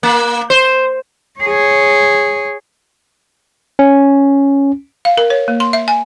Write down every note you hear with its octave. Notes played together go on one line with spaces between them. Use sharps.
A#3
C5
G#4 C#5
C#4
F5
A#4
C#5
A#3
C6
E5
G#5